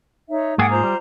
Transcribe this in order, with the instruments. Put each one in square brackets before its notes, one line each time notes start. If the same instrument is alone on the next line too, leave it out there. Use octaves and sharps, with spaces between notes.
[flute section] D#4 C#5 E5
[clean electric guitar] G#2 A#3 G#4 [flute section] F#5 G5
[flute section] F4 C5 A#5
[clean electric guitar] G3